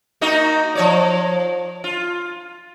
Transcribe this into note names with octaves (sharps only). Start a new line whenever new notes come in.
A#3 D#4 F#4
F3 C#5 D5
F4